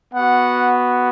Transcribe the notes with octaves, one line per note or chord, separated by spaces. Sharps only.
B3 F#4 F#5